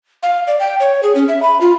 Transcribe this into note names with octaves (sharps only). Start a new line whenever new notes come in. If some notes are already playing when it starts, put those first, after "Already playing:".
F5
D5
G5
C#5
G#4
C#4
E5
B5
F4